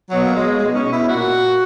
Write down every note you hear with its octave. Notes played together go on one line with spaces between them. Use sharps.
B2 F#3
A#3
B2 G#3
B2 G#3
D#4
C#4
B2
E4
A#2 F#4
A#2